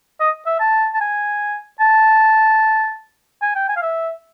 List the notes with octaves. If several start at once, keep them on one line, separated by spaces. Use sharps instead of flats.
D#5
E5
A5
A5
G#5
A5
G#5
G5
G#5
F5
E5